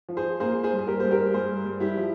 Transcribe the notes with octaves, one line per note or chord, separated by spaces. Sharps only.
F3
G#4 C5
A#3 G#4 C5
G#4 C5
G2
G#4
G4 A#4
G2 C5
G4 A#4
G2 G#4 C5
G2
E4 G4
F3